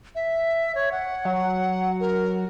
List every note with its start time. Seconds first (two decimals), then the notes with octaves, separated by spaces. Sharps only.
0.15 E5
0.75 C#5
0.92 F#5
1.25 F#3
2.00 A#4